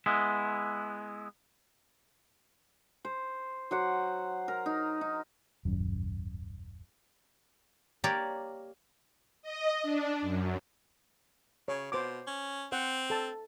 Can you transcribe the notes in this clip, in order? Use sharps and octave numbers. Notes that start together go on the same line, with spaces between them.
G#3 B3 E4
C5
F#3 C5 F#5 D6
A#4
D#4
D#4
D#1 G#1 F#2
A#3 G4 A#4 C#5 D5
D#5
D4
F#2
C#3 C#5
B2 C5 D6
C#4
C4 C5 F#5
A4 A5